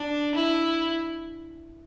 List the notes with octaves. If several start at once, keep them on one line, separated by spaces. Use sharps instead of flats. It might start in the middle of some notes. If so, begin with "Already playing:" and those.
Already playing: D4
E4